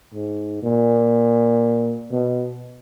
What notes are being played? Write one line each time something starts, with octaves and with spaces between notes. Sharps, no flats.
G#2
A#2
B2